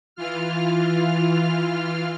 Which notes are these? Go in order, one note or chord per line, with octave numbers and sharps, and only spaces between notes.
E3 F4 F6